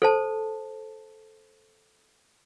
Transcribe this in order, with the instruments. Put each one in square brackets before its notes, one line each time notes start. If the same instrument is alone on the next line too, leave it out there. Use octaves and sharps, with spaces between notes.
[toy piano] A4 C5 A5